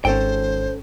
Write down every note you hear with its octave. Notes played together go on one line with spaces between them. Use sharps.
G#1 C#4 A4 C5 G5